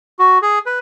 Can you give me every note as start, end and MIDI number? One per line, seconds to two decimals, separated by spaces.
0.19 0.38 66
0.42 0.59 68
0.66 0.79 71